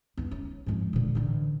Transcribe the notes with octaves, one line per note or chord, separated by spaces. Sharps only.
B3 D#4
C#4
F2 G#2
A#2 D3
A1 D3